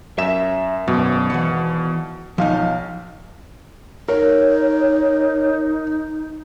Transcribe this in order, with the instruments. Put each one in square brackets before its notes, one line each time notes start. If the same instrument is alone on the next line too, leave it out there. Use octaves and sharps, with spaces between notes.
[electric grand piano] F#2 E7 [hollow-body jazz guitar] E5
[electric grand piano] G#1 B2 [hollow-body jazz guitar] F#2
[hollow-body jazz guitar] E3 F#5
[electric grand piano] B1 F5 [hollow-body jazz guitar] F3 D#4
[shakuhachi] D#4 [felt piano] A#4 [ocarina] C#5